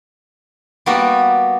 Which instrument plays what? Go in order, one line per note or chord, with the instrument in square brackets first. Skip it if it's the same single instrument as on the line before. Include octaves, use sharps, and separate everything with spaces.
[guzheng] G3 A#3 B3 F#4 G4